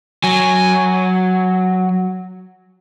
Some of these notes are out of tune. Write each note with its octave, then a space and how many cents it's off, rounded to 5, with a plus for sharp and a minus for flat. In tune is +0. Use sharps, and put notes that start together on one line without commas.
F#3 +0 G#5 +0